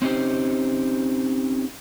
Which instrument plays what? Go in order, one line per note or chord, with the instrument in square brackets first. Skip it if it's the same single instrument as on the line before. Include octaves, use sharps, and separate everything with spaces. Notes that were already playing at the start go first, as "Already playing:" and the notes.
[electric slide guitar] C4 C#4 D#4 G4 C5